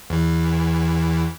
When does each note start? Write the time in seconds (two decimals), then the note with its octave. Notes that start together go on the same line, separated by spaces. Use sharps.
0.10 E2 E3